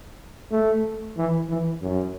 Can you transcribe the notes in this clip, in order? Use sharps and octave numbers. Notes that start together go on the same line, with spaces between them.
A3
E3
E3
F#2